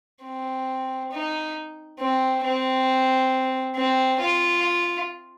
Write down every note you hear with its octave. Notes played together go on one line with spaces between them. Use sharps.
C4
D#4
C4
C4
C4
F4